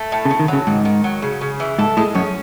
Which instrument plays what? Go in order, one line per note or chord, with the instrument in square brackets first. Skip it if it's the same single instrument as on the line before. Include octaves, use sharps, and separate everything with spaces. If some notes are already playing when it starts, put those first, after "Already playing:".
Already playing: [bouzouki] A3
A2
[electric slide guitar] C#3
[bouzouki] A2
[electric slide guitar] D#3
[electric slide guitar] C#3 [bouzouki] F#3
[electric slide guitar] G#2 [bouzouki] D#3
[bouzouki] D#3
F#3
C#3
C#3
E3
[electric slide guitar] G#2 [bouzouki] A4
[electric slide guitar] A2 [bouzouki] G#3
[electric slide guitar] F#2 [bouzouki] C#4